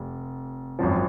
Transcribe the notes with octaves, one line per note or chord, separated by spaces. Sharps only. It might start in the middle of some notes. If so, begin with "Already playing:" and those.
Already playing: F1
G#1 F#2 F3